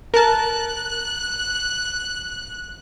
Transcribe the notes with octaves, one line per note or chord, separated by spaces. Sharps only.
A#4 A5 F#6